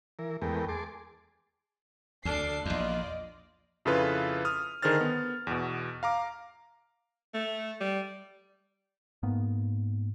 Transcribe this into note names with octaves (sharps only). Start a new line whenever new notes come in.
E3 A#4
E2 G#3 A3 B3 A#4 G5
G#4 A5 C6 D6
D2 D4 A4 D6 C7
A#1 E2 F4 D5 D#5
F2 C#3 E4 F4 A4 B4
D#6 F6
D3 D#3 G#4 C5 F6 A6
B3
E2 B2
F5 A#5 D6
A3
G3
G#2 A#3 B3